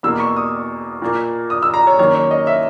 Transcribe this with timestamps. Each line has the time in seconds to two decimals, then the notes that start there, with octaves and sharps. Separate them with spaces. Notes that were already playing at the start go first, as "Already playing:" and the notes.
0.03 E2 B2 A#3 E6
0.20 C#6
0.37 D#6
1.02 A#2 A#3
1.50 D#6
1.63 E6
1.74 A#5
1.87 C#5
1.99 F#2 D#3 A#3 C#5
2.15 C#5
2.31 D#5
2.47 E5